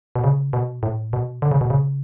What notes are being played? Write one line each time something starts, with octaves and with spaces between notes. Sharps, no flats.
B2
C#3
B2
A2
B2
D3
C#3
B2
C#3